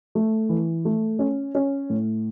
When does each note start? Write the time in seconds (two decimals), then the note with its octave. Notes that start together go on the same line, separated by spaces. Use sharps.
0.15 A3
0.49 E3
0.85 A3
1.19 C#4
1.55 C#4
1.90 A2